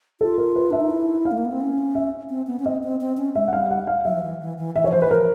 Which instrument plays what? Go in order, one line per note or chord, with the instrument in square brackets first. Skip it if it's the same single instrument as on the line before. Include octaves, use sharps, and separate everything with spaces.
[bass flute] F4 [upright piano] A4
[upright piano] A#4
B4
[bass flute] D4 [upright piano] E5
[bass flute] D#4
E4
[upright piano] F5
[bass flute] A3
A#3
B3
C4
C#4
[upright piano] E5
[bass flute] C4
B3
C#4
[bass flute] C4 [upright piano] D#5
[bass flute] C4
C4
C#4
[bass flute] G#3 [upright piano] E5
[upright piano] F#5
[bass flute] G3 [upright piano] F5
[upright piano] F#5
F5
[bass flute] F#3 [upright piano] E5
[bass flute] F3
E3
E3
E3
[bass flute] E3 [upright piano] E5
[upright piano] C#5
[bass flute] F3 [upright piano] C5
[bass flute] E3 [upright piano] B4
[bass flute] F3 [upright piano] A#4